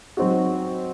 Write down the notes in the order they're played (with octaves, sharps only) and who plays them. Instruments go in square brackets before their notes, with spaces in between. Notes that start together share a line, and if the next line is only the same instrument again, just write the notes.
[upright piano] F#3 C4 D#4 F#4